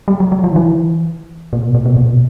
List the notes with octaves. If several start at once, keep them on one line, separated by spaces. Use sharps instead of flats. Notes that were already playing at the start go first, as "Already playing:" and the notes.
G3
F#3
F#3
F3
D#3
E3
A#2
B2
A#2
B2
A#2
B2